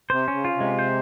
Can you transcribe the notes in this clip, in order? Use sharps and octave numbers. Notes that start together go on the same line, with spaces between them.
C3 C5
C#3 C#4
F4
C3 G#3
C5